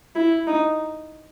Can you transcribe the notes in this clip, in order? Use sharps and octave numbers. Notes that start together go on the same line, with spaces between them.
E4
D#4